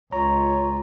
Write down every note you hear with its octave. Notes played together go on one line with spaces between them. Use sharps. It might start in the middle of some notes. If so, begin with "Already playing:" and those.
C#2 F4 C#5 A#5